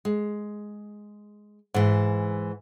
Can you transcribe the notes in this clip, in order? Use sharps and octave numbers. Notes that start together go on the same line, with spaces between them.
G#3
G#2 E3